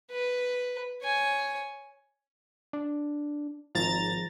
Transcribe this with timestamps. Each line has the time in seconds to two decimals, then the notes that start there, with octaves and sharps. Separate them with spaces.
0.11 B4
1.02 C#5 G#5
2.73 D4
3.75 G#1 F3 A#5 A6